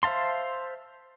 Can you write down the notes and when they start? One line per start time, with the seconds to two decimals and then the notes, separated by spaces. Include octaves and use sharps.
0.03 C5 E5 F5 A5 C6